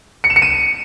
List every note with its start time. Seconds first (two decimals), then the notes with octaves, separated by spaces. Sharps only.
0.24 C#7
0.30 E7
0.36 C#7
0.42 D#7